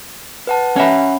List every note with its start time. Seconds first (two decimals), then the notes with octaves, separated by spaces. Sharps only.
0.47 B4 F#5 A5
0.76 C#4 C#5 E5 F#5 B5